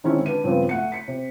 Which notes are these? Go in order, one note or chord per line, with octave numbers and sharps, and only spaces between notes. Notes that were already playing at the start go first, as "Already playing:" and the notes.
D3 D#3 G#3 C4 C#4 E4
D4 B4 D#7
G2 C#3 F3 B3 C4
A3 F#5 C#7
B6 C#7
C3